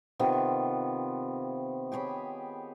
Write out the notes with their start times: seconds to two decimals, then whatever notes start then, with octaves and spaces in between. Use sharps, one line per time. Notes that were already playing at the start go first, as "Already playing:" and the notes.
0.19 C3 D#3 B3 F4
1.92 G4 G#4 C#5 B5